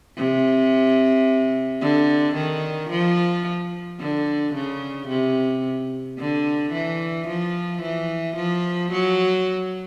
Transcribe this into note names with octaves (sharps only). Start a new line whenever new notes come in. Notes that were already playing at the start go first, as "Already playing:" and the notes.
C3
D3
D#3
F3
D3
C#3
C3
D3
E3
F3
E3
F3
F#3